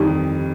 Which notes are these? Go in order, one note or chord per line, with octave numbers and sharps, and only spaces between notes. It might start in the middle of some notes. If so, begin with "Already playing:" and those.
Already playing: F2 D#3 G3